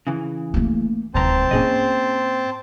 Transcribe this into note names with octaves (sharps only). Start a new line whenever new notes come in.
C#3 E3
A3 A#3
D1 C2 G#2 E3 C4 C5 A5 A#5
A2 A#3 C#4 G#4 D#5